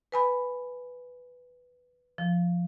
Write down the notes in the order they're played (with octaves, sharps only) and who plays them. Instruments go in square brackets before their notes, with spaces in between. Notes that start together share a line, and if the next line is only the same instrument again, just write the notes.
[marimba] B4 G#5 B5
F3